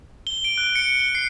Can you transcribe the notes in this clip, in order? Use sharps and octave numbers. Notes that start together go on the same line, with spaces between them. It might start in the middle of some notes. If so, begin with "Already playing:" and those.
G7
D7
F#6
C#7
G7
C7